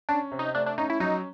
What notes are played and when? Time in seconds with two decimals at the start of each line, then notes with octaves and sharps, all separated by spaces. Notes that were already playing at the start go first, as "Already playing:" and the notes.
0.09 C#4 D4
0.32 C3
0.39 D#4
0.55 A3 D4
0.66 D4
0.78 C#4 D#4
0.90 E4
1.00 F#3 D#4